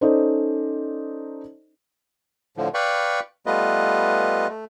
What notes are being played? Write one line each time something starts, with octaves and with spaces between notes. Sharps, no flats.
C#4 D#4 A4 C5 D5 D#5
A2 D3 F3
B4 D5 F5 G5 B5 C#6
G3 A3 B3 F4 B4 D#5
A3